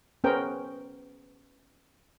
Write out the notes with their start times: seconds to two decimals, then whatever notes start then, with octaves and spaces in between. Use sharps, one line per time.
0.24 B3 C#4 G#4 A#4 C5 G5